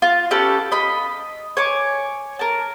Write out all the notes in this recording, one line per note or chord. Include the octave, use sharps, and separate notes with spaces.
F4
C#4 G4 A4 B4
D#5 B5
C#5 G#5 D6
A#4 A5